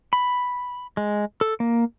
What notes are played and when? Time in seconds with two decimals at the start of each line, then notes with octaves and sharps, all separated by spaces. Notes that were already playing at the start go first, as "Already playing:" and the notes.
0.13 B5
0.97 G#3
1.41 A4
1.60 A#3